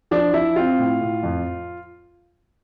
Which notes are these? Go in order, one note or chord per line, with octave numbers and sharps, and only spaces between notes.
F3 D4
F3 E4
C4 F4
A2
A2
F2